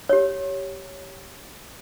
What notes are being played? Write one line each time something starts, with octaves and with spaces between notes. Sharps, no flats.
G4 C#5